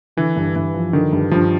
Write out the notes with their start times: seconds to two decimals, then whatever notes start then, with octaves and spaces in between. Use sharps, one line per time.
0.17 D3 E3
0.36 G2
0.56 G2 E3
0.74 F3
0.93 D3 D#3
1.12 G2
1.31 G2 F3